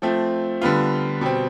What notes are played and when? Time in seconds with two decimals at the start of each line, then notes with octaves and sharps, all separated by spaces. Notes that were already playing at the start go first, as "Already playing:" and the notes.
0.02 F3 A3 C4
0.61 D3 G3 B3 F4
1.21 B2 G3 C4